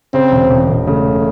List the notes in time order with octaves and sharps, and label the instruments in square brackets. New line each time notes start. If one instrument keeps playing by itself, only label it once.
[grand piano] C#3 [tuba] C4
[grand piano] E1
E1
E1
[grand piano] C#3 [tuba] A3